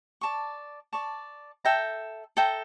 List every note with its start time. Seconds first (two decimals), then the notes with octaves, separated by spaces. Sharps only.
0.21 D5 A5 C#6
0.93 D5 A5 C#6
1.65 A4 E5 G5 A#5
2.37 A4 E5 G5 A#5